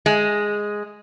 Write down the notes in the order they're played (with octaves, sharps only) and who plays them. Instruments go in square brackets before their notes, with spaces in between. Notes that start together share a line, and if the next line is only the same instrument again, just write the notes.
[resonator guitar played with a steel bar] G#3